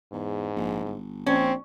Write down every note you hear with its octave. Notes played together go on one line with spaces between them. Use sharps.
E2 G#2
A#1
G1
A#1 C4 C#4